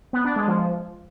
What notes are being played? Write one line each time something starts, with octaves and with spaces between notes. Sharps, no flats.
B3
D4
G#3
F3